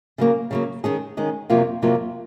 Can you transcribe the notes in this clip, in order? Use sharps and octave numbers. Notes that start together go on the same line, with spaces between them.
C#3 F#3 A#3
C#3 F#3 A#3
D#3 G#3 C#4 G#4
D#3 G#3 C#4 G#4
F2 C3 F#3 A#3 F4
F2 C3 F#3 A#3 F4